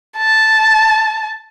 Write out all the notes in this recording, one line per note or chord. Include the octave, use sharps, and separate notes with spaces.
A5